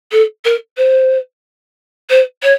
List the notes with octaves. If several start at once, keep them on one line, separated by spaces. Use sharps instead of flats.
A4
A#4
C5
C5
C#5